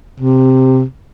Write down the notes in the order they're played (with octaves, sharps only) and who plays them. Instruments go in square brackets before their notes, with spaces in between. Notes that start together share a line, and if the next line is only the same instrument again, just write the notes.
[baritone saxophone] C3